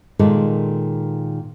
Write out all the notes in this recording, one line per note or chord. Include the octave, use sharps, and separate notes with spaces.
A#2 D#3 G#3 A4